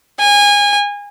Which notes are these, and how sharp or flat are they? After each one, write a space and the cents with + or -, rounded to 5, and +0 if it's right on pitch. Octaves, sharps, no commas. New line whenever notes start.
G#5 -25